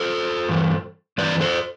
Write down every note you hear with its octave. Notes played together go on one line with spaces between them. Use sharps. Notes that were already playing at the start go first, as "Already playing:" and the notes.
Already playing: A4 C5
G2 E3
G2 E3 B4 D5
A4 C5